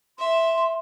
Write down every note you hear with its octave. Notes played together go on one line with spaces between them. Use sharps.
E5 C6